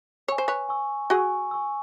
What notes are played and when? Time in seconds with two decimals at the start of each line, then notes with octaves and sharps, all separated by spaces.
0.28 C#5 G#5 C#6 E6
0.38 C5
0.48 B4 C#5
0.69 G#5 C#6 E6
1.10 F#4 G#4 G#5 C#6 E6
1.51 G#5 C#6 E6